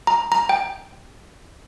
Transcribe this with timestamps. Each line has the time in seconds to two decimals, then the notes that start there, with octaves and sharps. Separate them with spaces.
0.07 A#5
0.32 A#5
0.49 G5